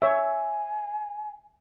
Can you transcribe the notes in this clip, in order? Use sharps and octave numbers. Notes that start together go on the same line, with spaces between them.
C#5 E5 G#5